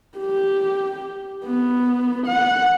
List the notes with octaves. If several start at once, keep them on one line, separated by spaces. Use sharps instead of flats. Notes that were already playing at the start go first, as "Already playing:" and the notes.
G4
B3
F#5